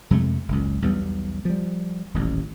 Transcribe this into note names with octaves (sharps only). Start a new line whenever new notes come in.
F2 C3 G#3 A3
F#1 C#2
B1 E2 G3 B3
F3 G3
D#1 A1